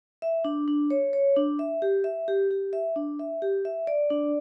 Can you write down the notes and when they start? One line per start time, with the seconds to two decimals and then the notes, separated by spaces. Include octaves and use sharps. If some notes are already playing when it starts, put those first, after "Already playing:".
0.22 E5
0.45 D4
0.68 D4
0.90 C#5
1.13 C#5
1.36 D4
1.59 E5
1.82 G4
2.04 E5
2.28 G4
2.51 G4
2.73 E5
2.96 D4
3.19 E5
3.42 G4
3.65 E5
3.87 D5
4.10 D4